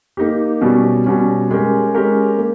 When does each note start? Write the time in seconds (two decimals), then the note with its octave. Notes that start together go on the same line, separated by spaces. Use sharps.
0.17 A#3 D#4 G4
0.61 B2 G3 C#4
1.06 B2 G3 C#4
1.50 G#3 C#4 G4 A#4
1.95 G#3 C#4 G4 A#4
2.38 A#3